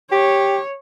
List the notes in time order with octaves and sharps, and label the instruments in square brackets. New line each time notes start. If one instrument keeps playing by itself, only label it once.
[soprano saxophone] G4 [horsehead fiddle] C#5